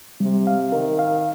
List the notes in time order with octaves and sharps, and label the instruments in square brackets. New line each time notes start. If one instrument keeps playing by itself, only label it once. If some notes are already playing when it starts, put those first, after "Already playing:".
[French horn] C3 [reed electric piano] G3
[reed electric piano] F5
[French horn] D#3 [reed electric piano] A#4
[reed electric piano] F5